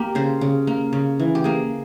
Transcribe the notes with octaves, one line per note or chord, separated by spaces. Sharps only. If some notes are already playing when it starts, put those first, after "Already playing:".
Already playing: A#3 G4
C#3 C5
C#3
A#3
C#3
E3
G4
A#3 G#4